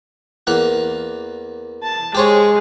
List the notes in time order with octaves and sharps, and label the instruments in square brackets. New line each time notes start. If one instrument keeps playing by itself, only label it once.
[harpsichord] E2 A#3 F#5
[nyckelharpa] A5
[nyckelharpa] G#3 [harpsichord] G4 C5 C#5